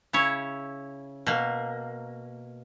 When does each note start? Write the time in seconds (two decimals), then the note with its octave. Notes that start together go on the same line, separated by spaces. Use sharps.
0.13 C#3 E4 C#5
1.26 B2 A#3